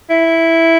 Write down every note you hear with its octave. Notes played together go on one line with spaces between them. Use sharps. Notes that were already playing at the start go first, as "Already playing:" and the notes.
E4